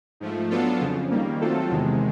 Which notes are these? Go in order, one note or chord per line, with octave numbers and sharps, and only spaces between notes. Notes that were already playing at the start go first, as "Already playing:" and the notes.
G#2 F3 A3
F#3 B3 D4 F4 A4
F2 C#3 F3
D#3 G3 A#3
F#3 A3 C4 F4 A4
E2 C3 D#3 G#3